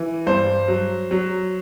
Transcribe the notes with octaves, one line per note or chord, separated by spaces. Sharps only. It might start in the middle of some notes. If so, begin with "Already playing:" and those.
Already playing: E3
G2 C5
F#3
F#3